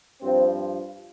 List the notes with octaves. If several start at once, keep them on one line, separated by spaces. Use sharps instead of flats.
G2 F3 C4